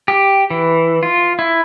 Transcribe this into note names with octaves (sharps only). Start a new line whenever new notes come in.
G4
E3
F4
E4